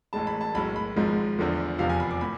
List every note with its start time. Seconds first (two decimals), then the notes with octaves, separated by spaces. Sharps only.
0.13 A1 A2 G#3 A5
0.27 B5
0.41 A5
0.55 B1 A2 G#3 B5
0.76 B5
0.96 G#1 G#2 F3 G#3
1.38 E2 D3 F3 A3
1.78 F1 E2 C3 F3 F5
1.90 G#5
2.00 B5
2.11 D6
2.21 A2 B5